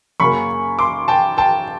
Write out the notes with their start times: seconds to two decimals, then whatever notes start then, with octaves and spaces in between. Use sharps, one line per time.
0.20 F#2 C#3 F#3 A#3 B5 C#6
0.79 C6 D6
1.08 G5 A5
1.38 G5 A5